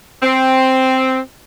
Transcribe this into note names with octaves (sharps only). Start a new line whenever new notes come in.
C4